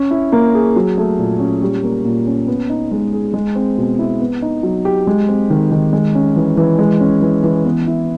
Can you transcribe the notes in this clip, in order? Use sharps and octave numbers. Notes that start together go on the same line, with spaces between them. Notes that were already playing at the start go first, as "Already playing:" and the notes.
Already playing: C#4
E4
A#3
G#4
F#3
A3
A#2
C#4
G3
A#3
A#2
C#4
B3
D#4
G#3
G#4
G#3
C4
B2
E4
B3
D#4
F#3
G4
G#3
C4
D#3
D#3
G#3
C#4
E3
E3
G#3
C#4
E3
E3
B3
E4